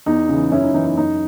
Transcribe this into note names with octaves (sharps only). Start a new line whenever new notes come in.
E2 D#4
C#3 E3
F#2 C#4 E4
D#4
E3 D#4
D#4
F#2 D#4